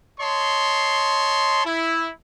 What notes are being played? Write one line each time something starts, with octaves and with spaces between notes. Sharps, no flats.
C#5 D#5 A5 C6
E4